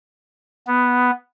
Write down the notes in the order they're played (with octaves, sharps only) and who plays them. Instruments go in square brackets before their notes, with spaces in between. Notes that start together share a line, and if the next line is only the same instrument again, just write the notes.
[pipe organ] B3